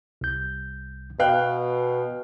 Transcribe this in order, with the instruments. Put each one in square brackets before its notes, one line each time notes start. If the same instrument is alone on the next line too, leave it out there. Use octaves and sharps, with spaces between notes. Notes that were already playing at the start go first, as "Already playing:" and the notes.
[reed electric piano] C2 G6
[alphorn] B2 [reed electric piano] B4 [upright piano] F5 G5 F#6